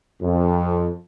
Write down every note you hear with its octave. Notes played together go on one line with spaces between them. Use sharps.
F2